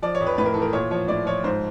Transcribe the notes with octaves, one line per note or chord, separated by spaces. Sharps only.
F3 D5
C#5
F2
B4
A2 B4
A#4
E3 A4
A#4
A#2 C#5
F3 C#5
A2 D5
F3 C#5
G#2 C5